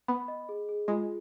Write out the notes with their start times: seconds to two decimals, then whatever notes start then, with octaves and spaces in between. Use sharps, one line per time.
0.08 B3 B5
0.28 D#5
0.49 G#4
0.69 G#4
0.88 G#3 F4